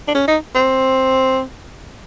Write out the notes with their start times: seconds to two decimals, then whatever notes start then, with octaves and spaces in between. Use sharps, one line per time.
0.08 D4
0.15 C#4
0.28 D#4
0.55 C4